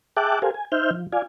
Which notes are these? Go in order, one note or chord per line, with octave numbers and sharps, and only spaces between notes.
G#4 E5 G5 A5 D6 F#6
G4 A4 A#4 C5 F5 G#5
G#5
D#4 C5 E5 F6 G6
F3
F4 D5 F5 G#5